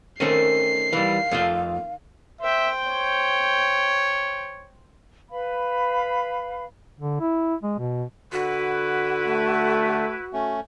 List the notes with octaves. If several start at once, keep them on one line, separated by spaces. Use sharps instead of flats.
D#3 A3 C4 C#4 C7
E3 G3 F5
F2 A3 F4
C5 E5 G5
C#5
B4 F5 B5
D3
E4
G#3
B2
D3 E4 F#4 B4
A3
A3 C#4